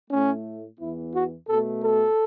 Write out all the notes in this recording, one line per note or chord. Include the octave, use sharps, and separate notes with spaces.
A2 A3 C#4
E2 E3 B3 E4
F#4
B2 A3 A4
A4